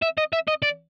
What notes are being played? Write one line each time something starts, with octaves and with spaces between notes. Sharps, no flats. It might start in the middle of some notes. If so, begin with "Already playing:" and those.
E5
D#5
E5
D#5
D5